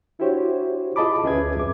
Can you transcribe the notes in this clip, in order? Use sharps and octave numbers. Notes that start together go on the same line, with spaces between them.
D4 E4 F#4 G4 C5 C#5
F4 G#4 D#5 A5 B5 D6
D2 C#4 G#4 B4 E5 G#6
F#2 C4 D6